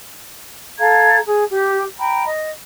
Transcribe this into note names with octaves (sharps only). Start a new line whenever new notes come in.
A4 F5 A#5 G#6
G#4
G4
G5 A#5 B5
D#5